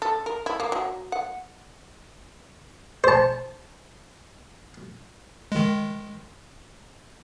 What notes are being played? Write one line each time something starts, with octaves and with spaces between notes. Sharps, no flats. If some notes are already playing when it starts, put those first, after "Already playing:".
A4
A#4
E4
A#3
F#3
F#5
C5 A5
D#3 G#3